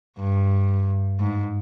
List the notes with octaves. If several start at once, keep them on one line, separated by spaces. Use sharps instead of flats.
G2
G#2